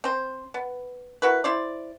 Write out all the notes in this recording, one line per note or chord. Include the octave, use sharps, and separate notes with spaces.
C4 C5
B3
E4 F#4 A#4 B4
E4 C5 D5